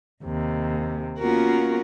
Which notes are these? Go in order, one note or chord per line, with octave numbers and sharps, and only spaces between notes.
D#2 C3
A#3 B3 C#4 F4 F#4 A#4